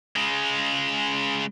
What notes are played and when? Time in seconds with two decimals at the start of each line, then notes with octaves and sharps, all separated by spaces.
0.16 C#3 G#3